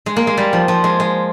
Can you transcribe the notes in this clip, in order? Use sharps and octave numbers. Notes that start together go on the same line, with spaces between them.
G#3
A#3
G#3
G3
F3
F3
G#3
G#3